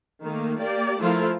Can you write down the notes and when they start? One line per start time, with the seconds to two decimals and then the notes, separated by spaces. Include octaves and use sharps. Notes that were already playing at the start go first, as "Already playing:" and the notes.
0.22 D#3 A3 A#3
0.58 A#3 G4 D5
0.99 F3 A3 E4 F4 A#4